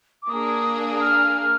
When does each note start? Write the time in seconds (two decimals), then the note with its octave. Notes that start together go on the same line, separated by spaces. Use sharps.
0.23 D6
0.29 A#3 D4 G#4 D#6
1.01 F6
1.37 F6